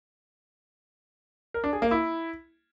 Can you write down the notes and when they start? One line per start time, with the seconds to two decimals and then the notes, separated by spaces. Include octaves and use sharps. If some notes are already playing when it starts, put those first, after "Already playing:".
1.54 A#4
1.64 D4
1.73 G#4
1.82 A#3
1.91 E4